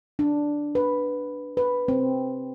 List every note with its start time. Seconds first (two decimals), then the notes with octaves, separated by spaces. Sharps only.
0.19 D4
0.75 B4
1.57 B4
1.88 C4